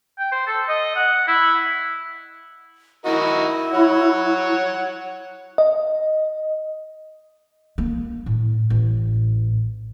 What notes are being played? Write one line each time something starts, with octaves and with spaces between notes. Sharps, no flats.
G5
C5
A4
D#5
F#5
E4
E4 F#4 A#4 D#5
C#5 F#5
D#5
A#3
A2
A1